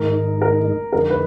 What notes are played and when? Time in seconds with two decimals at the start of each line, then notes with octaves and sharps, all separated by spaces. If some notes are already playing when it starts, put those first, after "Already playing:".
Already playing: G#2 D#3 G#3 D#4 A#4
0.42 A#4
0.93 F2 D3 G#3 D#4 A#4
1.10 B4